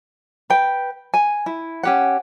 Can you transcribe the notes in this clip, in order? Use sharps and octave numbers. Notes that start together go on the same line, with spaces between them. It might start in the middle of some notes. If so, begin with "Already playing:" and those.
B4 G5
G#5
E4
C#4 G4 F#5